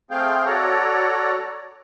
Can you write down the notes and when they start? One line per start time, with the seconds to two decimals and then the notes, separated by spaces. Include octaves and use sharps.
0.11 A3 C4 G#4 F5 G5
0.45 F#4 A4 C#5 D5 A#5